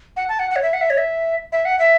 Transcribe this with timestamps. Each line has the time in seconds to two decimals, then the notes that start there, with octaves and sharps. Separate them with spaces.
0.17 F#5
0.29 A5
0.39 F#5
0.51 F#5
0.56 C#5
0.63 E5
0.73 F#5
0.81 E5
0.90 C#5
0.98 E5
1.52 E5
1.65 F#5
1.79 E5